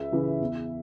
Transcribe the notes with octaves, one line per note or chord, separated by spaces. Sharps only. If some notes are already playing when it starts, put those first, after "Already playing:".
Already playing: C#2 E5
C#3 E3
E2